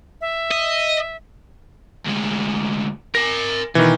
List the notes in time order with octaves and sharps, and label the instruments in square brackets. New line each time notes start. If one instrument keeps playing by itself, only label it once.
[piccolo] E5
[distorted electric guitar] D#5
[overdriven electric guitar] D2 G#3
[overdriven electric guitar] A#4 G#5 [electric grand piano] A#6
[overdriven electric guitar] B2 [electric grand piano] D#3 E3